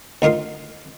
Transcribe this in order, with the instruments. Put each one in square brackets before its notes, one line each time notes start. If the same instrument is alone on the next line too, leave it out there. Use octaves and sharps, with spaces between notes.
[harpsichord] D2 D#4 F4 A#4 C6